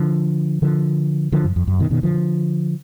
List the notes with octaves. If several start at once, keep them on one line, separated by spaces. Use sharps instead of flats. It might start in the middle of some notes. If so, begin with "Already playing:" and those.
Already playing: D3 F3
D3 F3
D3 F3
F#2
F2
F#2
B2 D#3
B2 D#3
D3 F3